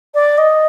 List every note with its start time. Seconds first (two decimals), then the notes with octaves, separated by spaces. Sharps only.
0.14 D5
0.38 D#5